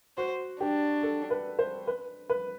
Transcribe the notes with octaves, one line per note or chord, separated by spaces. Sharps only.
F#4 C5
D4 G4
A4
B4
C5
B4
B4